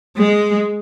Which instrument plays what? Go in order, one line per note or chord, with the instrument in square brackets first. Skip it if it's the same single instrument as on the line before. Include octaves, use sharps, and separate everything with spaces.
[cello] G#3